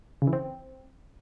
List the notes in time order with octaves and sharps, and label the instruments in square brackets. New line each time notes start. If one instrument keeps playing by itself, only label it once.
[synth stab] C#3
E3
C4